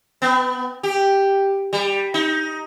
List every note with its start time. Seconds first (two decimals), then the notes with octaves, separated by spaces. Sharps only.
0.22 B3
0.83 G4
1.73 G3
2.14 D#4